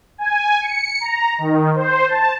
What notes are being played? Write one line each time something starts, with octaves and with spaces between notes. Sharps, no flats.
G#5
C#7
A#5
D#3
C5
A5